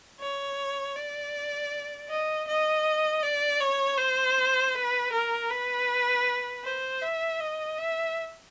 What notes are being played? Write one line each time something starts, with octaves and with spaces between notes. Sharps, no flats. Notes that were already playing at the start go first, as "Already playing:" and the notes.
C#5
D5
D#5
D#5
D5
C#5
C5
B4
A#4
B4
C5
E5
D#5
E5